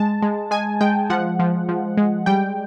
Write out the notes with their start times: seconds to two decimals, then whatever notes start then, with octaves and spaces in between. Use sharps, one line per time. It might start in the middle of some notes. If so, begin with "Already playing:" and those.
Already playing: G#3 A5
0.22 G#3
0.51 G#3 G#5
0.81 G#3 G5
1.10 F3 F#5
1.39 F3
1.69 F3
1.97 G#3
2.26 G3 G5